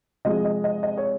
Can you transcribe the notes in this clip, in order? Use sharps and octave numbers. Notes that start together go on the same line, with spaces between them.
C3 F3 G#3 D#5
D#5
D#5
D#5
C#5